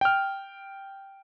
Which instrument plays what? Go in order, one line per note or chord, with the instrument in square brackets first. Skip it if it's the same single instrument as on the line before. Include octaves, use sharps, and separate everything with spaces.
[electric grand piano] G5 F6